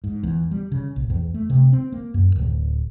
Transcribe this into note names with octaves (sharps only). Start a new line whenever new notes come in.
G#2
E2
G3
C#3
A#1
E2
A3
C3
C4
A#3
F#2
D1